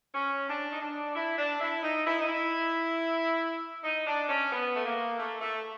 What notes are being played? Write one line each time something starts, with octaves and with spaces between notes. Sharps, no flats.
C#4
D4
D#4
D4
E4
D4
E4
D#4
E4
D#4
E4
D#4
D4
C#4
B3
A3
A#3
A3
A3